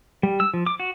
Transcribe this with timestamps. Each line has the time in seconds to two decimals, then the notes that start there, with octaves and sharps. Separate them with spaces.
0.23 G3
0.40 E6
0.54 F3
0.66 D6
0.80 F#4